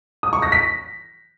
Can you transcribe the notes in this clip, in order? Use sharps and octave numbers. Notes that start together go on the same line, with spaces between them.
D#6
C#6
A#6
B6